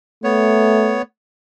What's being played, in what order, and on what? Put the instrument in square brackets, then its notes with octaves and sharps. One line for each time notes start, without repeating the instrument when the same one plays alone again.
[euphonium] A3 [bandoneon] B3 C#5